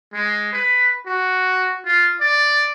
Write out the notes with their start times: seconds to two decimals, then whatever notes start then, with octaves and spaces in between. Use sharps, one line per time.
0.14 G#3
0.53 B4
1.07 F#4
1.86 F4
2.21 D5